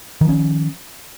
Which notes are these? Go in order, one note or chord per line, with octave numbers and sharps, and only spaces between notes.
D#3 F3 C#4